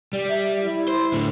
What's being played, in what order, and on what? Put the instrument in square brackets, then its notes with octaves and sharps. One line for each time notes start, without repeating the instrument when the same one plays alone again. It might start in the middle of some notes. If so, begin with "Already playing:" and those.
[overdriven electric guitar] G3
[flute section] E5
E4
[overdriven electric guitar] C5
A2 D3